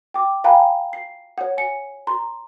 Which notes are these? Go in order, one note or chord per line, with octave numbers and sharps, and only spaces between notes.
G5 D6
F5 G5 G#5 A#5 B5
C7
C#5 F#5
G#5 C#7
A#5 C6